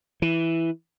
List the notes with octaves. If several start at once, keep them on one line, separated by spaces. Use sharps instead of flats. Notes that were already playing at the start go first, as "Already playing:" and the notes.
E3